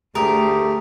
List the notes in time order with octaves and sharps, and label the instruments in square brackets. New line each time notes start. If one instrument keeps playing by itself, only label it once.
[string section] D2 [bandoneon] A3 G4 [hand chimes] G#4 A#5 D#6 [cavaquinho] A#4